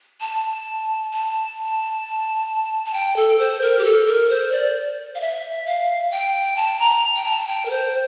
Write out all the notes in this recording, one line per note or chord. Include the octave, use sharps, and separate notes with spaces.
A5
A5
A5
G5
A4
C5
A#4
G4
A4
A#4
C5
D5
F5
E5
F5
G5
A5
A#5
G5
A5
G5
A#4
C5